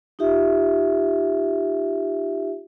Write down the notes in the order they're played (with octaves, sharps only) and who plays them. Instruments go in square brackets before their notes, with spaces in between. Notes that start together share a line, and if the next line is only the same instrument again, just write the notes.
[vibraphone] D#4 F4 G4 E5